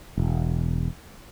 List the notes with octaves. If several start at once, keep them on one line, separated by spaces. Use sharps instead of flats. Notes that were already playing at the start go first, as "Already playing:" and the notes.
E1